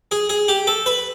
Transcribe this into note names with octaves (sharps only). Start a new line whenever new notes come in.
G#4
G#4
G4
A4
B4